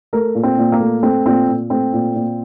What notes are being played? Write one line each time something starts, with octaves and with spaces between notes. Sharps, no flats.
A3 A#4
A#2
C4
A#2
A#3
A3
A3 C4
A#2 C4
A#2
A3 C4
A#2
A#2